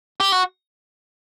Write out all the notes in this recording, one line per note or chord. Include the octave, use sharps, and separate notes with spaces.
G4
F#4